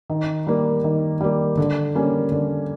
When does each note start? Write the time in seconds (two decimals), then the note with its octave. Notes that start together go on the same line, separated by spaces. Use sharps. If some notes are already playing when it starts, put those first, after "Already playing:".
0.10 D#3
0.47 G3 A#3
0.84 D#3
1.21 G3 A#3
1.57 D3
1.95 G3 A#3 C#4
2.32 D3